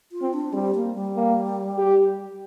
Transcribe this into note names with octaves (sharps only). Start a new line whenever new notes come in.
F4
C4
D4
G3 C4
A#3
G3
A#3
G4